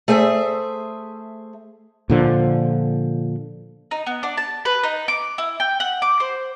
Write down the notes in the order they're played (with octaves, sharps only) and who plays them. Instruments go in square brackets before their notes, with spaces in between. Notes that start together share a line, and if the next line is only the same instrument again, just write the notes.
[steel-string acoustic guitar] A3 G#4 C5 E5
[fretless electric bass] A#2 D3 F3
[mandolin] D#4
B3
D4
A5
B4
D#4
D6
E4
G5
F#5
D6
C5